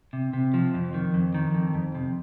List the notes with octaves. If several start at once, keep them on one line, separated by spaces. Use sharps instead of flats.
C3
C3
F3
F2
D#3
F2
D#3
F2
F2
C3